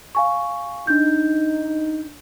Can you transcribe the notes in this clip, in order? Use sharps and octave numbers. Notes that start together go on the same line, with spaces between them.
F5 G#5 C#6
D4 D#4 G6